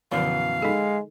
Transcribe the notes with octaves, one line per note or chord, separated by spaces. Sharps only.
F#2 B2 D3 E3 F3 F5
G#3 D#4 A4